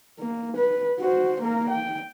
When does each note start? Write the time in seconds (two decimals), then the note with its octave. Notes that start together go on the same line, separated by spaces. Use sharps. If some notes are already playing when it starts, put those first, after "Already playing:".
0.20 A#3
0.57 B4
1.00 F#4 C5
1.42 A#3 A#4
1.70 G5